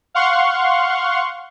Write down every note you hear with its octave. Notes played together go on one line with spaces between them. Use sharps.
F5 F#5 C6 C#6